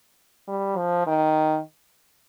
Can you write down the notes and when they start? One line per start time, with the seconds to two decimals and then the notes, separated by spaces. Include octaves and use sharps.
0.48 G3
0.77 F3
1.06 D#3